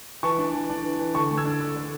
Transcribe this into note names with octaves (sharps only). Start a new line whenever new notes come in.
E3 A5 C#6
D4
E3
D4
E3
E3
D3 A5 C#6
A3
E6 G#6
D4
D3
D3